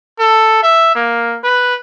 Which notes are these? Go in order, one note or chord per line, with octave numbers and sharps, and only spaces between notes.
A4
E5
A#3
B4